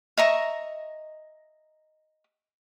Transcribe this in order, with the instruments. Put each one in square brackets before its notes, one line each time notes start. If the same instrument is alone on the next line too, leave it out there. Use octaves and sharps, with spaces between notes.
[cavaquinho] D#5 E5 A#5 C#6